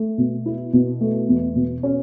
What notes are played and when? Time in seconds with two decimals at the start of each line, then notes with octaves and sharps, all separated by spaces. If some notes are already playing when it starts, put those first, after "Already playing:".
Already playing: A3
0.18 B2
0.46 E4
0.73 B2
1.01 A3
1.29 E2
1.56 B2
1.83 C#4